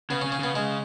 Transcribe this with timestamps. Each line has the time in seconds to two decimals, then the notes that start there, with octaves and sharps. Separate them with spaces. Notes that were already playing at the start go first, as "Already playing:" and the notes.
0.10 C#3 B3
0.22 C#4
0.25 C#3
0.32 C#4
0.39 C#3 B3
0.55 C#3 G#3